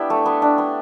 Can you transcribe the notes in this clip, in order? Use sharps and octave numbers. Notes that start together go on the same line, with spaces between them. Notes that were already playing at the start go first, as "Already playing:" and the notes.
Already playing: B3 D4 E4 G4
A3
B3
D4
B3